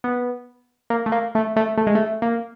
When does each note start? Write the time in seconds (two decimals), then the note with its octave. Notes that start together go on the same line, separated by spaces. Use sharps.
0.04 B3
0.90 A#3
1.06 A3
1.12 A#3
1.35 A3
1.56 A3
1.78 A3
1.87 G#3
1.95 A3
2.22 A#3